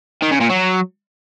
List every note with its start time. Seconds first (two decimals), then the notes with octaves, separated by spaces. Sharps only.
0.22 D#3
0.31 C#3
0.40 A#2
0.49 F#3